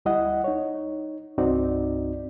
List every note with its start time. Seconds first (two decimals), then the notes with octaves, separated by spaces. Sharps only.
0.05 D2 G3 E4 D#5 F#5
0.44 D#4 C#5
1.38 C2 G2 C4 D#4 F#4 D5